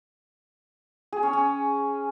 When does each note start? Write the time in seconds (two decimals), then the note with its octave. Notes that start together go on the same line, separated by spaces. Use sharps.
1.12 G#4
1.23 C#4
1.33 C#4